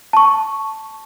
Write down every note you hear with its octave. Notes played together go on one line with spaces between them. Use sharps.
A5 C#6